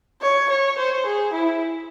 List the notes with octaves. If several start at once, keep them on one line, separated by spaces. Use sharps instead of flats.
C#5
C#5
C5
G#4
E4